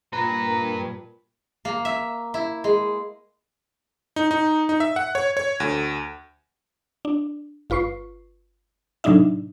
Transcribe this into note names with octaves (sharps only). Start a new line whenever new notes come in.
G2 A#2 B4 A#5
A#4
A#3
E5
E4
G#3
D#4
D#4
D#4
E5
F#5
C#5
C#5
D2
D4
G1 F4 B4 C#6 C7
A2 C3 F#3 D4 D#4 E5